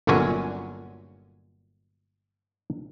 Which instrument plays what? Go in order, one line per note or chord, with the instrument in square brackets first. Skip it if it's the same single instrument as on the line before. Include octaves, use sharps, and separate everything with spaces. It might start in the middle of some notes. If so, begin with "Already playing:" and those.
[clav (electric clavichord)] G1 A#2 D3 F#3 C#4 G#5